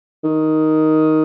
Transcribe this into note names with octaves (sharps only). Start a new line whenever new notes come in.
D#3